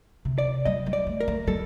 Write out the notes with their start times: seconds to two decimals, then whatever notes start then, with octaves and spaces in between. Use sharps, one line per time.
0.25 C3
0.38 D5
0.65 G3 D#5
0.86 G3
0.93 D5
1.07 A3
1.21 A#4
1.28 A3
1.47 G3 A4